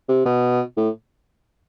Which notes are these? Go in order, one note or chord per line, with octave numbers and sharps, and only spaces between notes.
C3
B2
A2